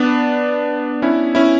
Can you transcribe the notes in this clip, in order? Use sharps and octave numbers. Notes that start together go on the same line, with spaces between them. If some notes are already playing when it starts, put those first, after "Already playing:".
Already playing: B3 D4
C#4 E4
C#4 E4